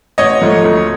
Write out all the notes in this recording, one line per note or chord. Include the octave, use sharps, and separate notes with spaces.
A1 C#5 D#5
G#2 F3 A3
D2